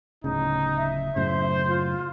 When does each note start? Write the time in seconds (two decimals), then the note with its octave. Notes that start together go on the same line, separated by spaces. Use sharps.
0.24 D1 A2 C#3 D#4
0.76 E5
1.16 F#2 A2 C#3 C5
1.66 F4